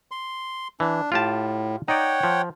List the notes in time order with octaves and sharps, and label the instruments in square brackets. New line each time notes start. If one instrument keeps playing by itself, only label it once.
[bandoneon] C6
[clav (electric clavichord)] E3 [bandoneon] D4
[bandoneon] A2 [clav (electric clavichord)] F4 G4 A5
[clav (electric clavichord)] D#4 D5 [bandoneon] C#5 F#5 G5
[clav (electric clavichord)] F3